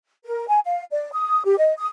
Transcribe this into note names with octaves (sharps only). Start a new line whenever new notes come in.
A#4
G#5
F5
D5
D#6
G4
D#5
D#6